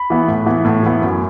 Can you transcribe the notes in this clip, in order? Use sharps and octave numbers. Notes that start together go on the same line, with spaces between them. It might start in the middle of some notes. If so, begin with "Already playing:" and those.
Already playing: B5
E3 B3
A2
E3 B3
A2
E3 B3
F#2